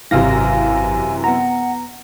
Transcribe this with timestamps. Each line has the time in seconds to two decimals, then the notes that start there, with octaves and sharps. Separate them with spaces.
0.11 G#1 F#2 C3 E3 F5 G#5 A#6
1.24 B3 F#5 A#5